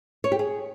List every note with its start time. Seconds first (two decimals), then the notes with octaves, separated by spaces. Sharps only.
0.24 C#5
0.32 G4
0.39 G#4